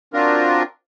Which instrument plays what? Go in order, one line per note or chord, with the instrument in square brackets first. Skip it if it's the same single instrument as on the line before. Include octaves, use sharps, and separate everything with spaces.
[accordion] F#3 C4 D4 F4 A#4